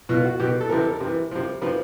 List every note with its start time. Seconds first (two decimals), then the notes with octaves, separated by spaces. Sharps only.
0.09 B2 F4
0.25 F#4
0.39 B2 G4
0.61 A4
0.70 C3 E3 A#4
0.81 A4
0.91 A#4
1.00 C3
1.06 E3
1.31 C3 F3
1.62 C3 F3 B4